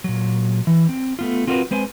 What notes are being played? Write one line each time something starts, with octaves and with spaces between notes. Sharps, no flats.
A#2 F#3
E3
C4
A3 B3 F4
C4 F4 F#4 G#4 A#4 B4
G#3 C4 B4 C5 G5 G#5